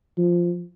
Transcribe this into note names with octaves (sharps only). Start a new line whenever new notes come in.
F3